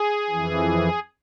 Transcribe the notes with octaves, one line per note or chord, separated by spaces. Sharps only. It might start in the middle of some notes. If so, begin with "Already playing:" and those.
Already playing: G#4
F2 E3